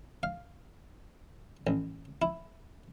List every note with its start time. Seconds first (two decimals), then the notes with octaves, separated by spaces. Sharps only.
0.23 F5
1.67 A1
2.22 E4